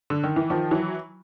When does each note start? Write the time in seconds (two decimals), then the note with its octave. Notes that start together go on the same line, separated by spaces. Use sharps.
0.10 D3
0.24 D#3
0.36 E3
0.50 D#3 F3
0.71 E3 F#3